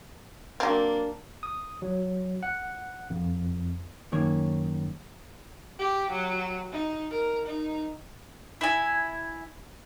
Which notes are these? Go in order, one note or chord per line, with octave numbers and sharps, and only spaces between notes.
F#3 A#3 C4 D4
D#6
F#3
F#5
F2
F#2 D#3 A#3 C#5
G4
F#3
D#4
A#4
D#4
E4 G#5